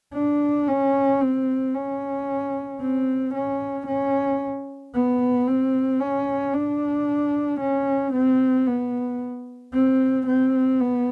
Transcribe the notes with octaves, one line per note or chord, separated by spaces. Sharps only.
D4
C#4
C4
C#4
C4
C#4
C#4
B3
C4
C#4
D4
C#4
C4
B3
C4
C4
B3